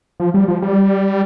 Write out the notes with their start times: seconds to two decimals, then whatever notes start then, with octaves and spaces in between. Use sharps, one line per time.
0.20 F3
0.34 G3
0.48 F3
0.62 G3